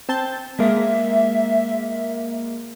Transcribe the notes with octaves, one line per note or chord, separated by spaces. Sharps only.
C4 A5 G6
G#3 A#3 E5